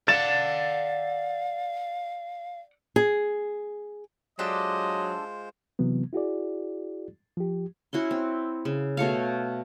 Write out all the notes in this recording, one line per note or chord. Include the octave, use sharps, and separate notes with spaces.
D5 F5 F#5 A6 E7
G#4
F#3 G#3 D4 F4 G4 A4 C5 D#5
C3 E3 F#3 B3
E4 F#4 G#4 D5
F3 G4
C#4 E4 F#4 C6
C4
C#3
B2 A3 C#5 F5